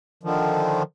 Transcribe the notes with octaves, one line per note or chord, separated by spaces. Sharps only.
D3 D#3 F3